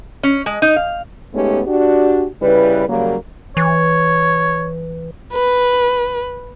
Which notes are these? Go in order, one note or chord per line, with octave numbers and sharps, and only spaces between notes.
C#4
G#3
D#4
F5
G#3 A3 B3 C#4 D#4 G4
D4 F#4 G4
C#3 G3 E4 B4
C#3 F#3 G3 A#3
E3 C#5
B4